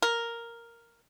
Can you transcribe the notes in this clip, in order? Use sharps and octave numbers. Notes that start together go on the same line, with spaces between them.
A#4